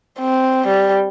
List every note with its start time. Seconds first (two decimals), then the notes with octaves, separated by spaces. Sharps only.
0.20 C4
0.68 G3